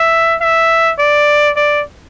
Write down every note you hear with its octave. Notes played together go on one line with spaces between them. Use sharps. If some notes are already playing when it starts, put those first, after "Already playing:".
Already playing: E5
E5
D5
D5